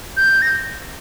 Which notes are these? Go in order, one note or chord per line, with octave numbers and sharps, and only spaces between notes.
G6
A#6